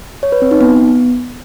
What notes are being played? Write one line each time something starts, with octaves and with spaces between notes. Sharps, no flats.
C#5
B4
C4
D#4
B3